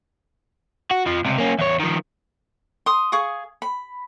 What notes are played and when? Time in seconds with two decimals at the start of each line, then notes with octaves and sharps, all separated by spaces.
0.91 F#4
1.06 F2 F3
1.25 C#2 C3
1.38 A#3 C#4
1.59 E2 C#5
1.80 D#3 F3
2.86 C6 D#6
3.12 G#4 F5 C#6 D#6
3.62 B5